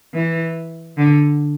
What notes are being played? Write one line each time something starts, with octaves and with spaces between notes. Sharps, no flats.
E3
D3